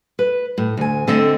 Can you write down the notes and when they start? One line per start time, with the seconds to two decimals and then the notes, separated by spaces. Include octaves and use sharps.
0.19 B4
0.58 A2
0.77 D2 G#5
1.07 D2 D3 A3 C4 A4 D#5